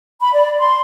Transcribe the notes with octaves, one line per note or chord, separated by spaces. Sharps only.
B5
D5
C6